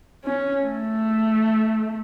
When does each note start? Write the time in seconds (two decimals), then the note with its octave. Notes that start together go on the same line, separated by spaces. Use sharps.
0.24 C#4
0.63 A3